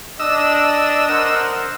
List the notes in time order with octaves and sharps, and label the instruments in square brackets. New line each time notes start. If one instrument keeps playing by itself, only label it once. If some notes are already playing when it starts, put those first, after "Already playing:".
[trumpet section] D4 [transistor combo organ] D#5 E6
[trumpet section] A#4 C5 F#5